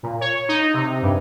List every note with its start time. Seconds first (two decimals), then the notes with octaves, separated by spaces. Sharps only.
0.03 A#2
0.21 C#5
0.49 D#4
0.74 C3
1.02 G2